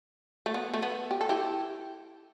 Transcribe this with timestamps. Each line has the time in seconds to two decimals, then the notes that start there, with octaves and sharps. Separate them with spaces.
0.46 A3
0.54 B3
0.74 A3
0.82 B3
1.11 G4
1.21 A4
1.29 E4 G4